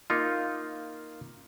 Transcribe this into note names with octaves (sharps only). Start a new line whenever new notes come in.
A#3 D#4 F4